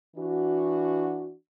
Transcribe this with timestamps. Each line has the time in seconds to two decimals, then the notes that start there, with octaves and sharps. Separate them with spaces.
0.17 E3 D4 F#4